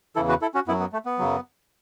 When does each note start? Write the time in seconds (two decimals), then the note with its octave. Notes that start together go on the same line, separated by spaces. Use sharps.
0.16 E2 C#3 E3 E4 A4
0.29 F#4 B4
0.42 E4 A4
0.54 C#4 F#4
0.68 F#2 B3 E4
0.72 F#3
0.80 B3
0.93 A3
1.06 B3
1.18 F#2 C#3 F#3